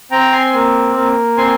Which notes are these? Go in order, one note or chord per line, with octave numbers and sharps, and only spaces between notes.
C4 G5 A#5
G#5 C6
A#3
A#3
C4 G#5 C6